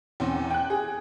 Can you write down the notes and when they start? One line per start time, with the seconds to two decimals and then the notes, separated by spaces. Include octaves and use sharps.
0.20 E2 C4 C#4
0.50 G5 F#6
0.70 G#4